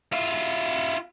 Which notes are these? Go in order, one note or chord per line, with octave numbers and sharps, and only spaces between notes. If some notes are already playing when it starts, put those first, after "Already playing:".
E4 F4